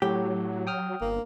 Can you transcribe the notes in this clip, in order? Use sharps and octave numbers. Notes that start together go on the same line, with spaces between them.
A2 F#3 G4
G5 D#6 F6
G1 A#3